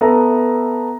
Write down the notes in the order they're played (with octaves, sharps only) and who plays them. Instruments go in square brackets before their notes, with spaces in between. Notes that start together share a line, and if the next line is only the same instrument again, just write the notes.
[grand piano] B3 A4 E5 A#5